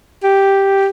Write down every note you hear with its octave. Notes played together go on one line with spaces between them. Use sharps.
G4